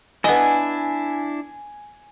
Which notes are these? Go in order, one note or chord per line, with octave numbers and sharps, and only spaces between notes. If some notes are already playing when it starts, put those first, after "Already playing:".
B3 D4 E4 D#5 G#5